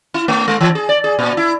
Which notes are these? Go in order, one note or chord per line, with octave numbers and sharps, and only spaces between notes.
E4
A3
G#3
E3
G#4
D5
G#4
A#2
E4